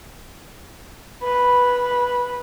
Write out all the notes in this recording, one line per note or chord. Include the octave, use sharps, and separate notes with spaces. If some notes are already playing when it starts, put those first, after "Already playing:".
B4